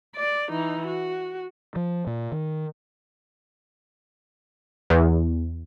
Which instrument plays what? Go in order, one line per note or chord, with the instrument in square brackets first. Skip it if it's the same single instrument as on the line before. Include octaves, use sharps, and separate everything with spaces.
[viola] D5
E3 D#4
F#4
[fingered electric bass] F3
A#2
D#3
[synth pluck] E2